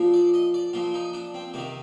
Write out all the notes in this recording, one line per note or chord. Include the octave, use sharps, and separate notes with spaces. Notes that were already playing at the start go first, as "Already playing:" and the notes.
Already playing: A#2 F3
D5
D#5
D5
A#2 F3 F4
D#4
D4
C4
C3 D#3 A#3